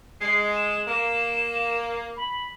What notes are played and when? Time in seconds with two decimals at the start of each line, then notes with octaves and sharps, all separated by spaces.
0.21 G#3 C7
0.56 E7
0.87 A#3 E7
2.17 B5